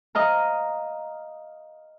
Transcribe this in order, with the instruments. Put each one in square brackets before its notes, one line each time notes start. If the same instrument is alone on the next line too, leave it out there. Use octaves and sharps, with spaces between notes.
[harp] D#5 F5 A#5